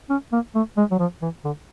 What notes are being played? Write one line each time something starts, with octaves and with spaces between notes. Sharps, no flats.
C#4
A#3
A3
G#3
F#3
F3
E3
D3